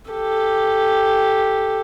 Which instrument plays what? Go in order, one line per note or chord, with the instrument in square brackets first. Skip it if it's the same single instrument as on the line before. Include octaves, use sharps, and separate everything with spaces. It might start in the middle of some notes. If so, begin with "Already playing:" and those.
[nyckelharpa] G4 A4